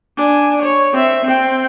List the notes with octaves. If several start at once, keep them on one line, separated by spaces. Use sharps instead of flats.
D4 G#5
C#5
C4 E5
C4 G5